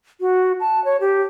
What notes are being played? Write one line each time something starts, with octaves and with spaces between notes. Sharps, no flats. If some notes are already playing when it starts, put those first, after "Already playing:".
F#4
A5
C#5
G4